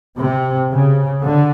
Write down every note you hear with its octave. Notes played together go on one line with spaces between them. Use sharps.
C3
C#3
D3